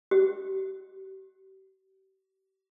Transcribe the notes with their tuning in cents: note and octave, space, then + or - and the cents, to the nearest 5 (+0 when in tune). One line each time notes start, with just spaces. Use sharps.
G4 -40